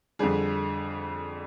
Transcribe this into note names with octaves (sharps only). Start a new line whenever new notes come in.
F2 D3 G3 G#4